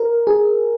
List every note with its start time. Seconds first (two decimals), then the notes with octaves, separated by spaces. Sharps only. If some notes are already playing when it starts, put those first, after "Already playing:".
Already playing: A#4
0.27 G#4